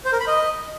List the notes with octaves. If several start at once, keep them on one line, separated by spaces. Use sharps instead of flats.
C5
A#4
B5
D#5